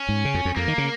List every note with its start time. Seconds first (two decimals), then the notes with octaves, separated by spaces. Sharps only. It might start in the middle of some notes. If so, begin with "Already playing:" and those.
Already playing: C#4
0.09 G#2
0.25 C#3
0.34 F2
0.45 F2
0.56 F2 A#3
0.68 D#3
0.78 C#3